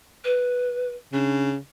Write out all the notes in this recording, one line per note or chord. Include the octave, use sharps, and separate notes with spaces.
B4
C#3 D4